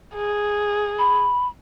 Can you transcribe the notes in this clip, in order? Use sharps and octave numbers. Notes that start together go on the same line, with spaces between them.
G#4
B5